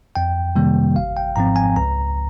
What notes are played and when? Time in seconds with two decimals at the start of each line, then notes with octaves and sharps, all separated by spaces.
0.15 F2 G5
0.56 C3 D#3 G3 A#3
0.96 G#1 F5
1.17 G5
1.36 G#2 F3 C4 A#5
1.56 G#5
1.76 C#2 A#5